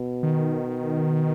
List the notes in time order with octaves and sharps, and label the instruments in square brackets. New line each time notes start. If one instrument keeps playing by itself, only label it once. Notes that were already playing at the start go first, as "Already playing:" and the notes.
Already playing: [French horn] B2
[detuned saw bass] D#3